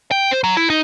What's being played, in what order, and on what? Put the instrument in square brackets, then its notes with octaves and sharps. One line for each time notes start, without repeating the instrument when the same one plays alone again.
[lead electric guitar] G5
C5
F#3
E4
D#4